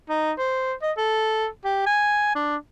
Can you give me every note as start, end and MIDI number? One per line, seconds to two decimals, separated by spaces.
0.10 0.32 63
0.38 0.74 72
0.82 0.92 75
0.97 1.47 69
1.65 1.84 67
1.87 2.31 80
2.35 2.57 62